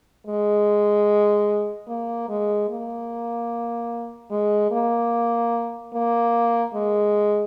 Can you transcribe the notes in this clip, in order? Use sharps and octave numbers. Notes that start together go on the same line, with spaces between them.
G#3
A#3
G#3
A#3
G#3
A#3
A#3
G#3